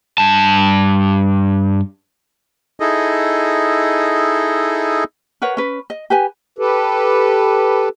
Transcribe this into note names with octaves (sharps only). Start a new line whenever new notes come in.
G2 A5
D#4 E4 G#4 A4 D#5
A#4 B4 C#5 F#5
C#4 B4
D#5
G4 B4 G#5
G4 A4 B4